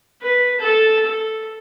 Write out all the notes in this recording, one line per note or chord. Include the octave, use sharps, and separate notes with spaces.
B4
A4 A5
A4